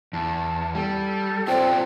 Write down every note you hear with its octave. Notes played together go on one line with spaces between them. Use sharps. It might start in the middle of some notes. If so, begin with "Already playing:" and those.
E2 A5
G3 A4
C4 F4 C#5 D5 G5